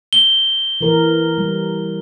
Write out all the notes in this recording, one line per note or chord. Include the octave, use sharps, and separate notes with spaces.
G7
E3 A#4
G3